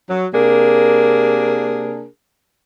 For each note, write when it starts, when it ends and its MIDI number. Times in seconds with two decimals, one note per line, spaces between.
0.10 0.26 54
0.33 2.06 48
0.33 2.06 58
0.33 2.06 62
0.33 2.06 68
0.33 2.06 70